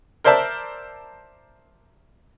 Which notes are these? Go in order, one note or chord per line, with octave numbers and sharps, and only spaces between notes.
A#4 C5 D5 E5 A5